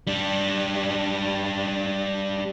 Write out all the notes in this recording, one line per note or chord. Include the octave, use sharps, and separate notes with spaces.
G3 D4